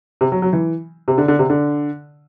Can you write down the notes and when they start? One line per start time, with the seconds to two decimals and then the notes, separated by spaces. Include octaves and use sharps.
0.21 C3
0.32 F#3
0.42 F#3
0.53 E3
1.08 C3
1.18 D3
1.28 D3
1.39 C3
1.50 D3